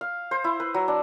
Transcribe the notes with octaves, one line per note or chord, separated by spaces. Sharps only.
F5
C5
E4
B4
F#3
D4